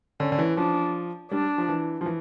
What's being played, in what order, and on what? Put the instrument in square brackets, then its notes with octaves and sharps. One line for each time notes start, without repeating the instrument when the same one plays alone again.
[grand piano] D3 [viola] C#4
[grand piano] D3
E3
[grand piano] F3 [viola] D4
[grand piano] G3 [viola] D4
[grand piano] F3
E3
F3
E3